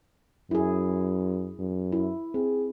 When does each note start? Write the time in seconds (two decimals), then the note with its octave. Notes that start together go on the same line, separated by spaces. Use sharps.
0.51 F#2 E4 G#4
1.59 F#2
1.92 E4
2.34 C4 G#4